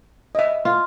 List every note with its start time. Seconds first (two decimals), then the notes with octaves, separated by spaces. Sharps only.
0.35 D#5 E5
0.65 F4